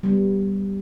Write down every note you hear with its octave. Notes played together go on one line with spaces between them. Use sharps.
G3 B3